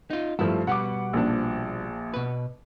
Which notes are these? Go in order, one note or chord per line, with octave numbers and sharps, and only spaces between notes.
D#4 F4
G2 F3 A3 E4
B2 G3 B3 F#5 D6
A#1 F3 D4
B2 B4